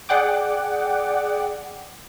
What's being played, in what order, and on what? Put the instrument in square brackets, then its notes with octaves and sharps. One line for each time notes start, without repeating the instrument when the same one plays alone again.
[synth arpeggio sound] G#4 D5 F#5 G5 D6